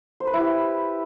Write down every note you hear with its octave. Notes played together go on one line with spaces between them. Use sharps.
C5
B4
E4
G4